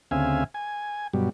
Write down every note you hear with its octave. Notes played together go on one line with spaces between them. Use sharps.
D2 C#3 C4 E5 F5 G#5
G#5
G2 B2 F#3 G3